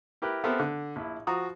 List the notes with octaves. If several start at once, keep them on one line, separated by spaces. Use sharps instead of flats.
E4 G4 A#4 B4
B3 C4 G4 A4 A#4 E5
D3
A#1 E4
F3 F#4 A#5 D#6